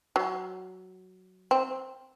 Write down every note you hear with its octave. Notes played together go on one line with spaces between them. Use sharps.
F#3
C4